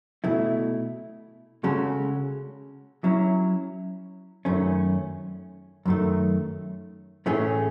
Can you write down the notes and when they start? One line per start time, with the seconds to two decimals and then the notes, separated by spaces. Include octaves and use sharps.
0.24 B2 A3 E4
1.64 C#3 G#3 C#4 F#4 A4
3.04 F#3 C#4 E4
4.45 F#2 D#3 A3 C#4
5.86 F#2 D#3 A3
7.26 A2 E3 A3 C#4 G#4